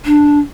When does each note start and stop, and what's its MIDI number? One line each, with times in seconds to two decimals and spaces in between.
0.06 0.39 62